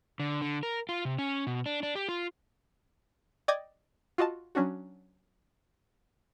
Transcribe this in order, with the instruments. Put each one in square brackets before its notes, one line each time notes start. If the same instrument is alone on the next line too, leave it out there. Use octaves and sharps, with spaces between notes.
[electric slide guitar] D3
D3
A#4
F4
C3
C#4
B2
D4
D4
G4
F4
[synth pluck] D5 D#5 G5 D6 G#6 A#6
F4 F#4 D#5 A5
F#3 C#4 D4 F#4